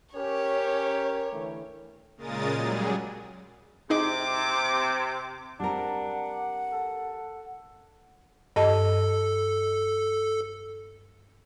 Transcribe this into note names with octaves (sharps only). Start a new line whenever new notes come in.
C#4 G4 A#4 C#5
D3 E3 A3
A#2 C#3 G#3 A#4 D#6 A6
F#3 G3 G#4
C3 C4 D#4 G#4 D#5 D6
G3 C4 D4 A#4 F#5
A4
G2 A4 D#5 A5